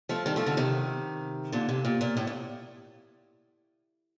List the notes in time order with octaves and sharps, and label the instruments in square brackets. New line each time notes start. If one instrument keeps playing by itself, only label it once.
[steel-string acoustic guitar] F3 A3
D#3 G3
F3 A3
D3 F3
C3 D#3
A#2 D3
C3
A#2
A#2
A2
A#2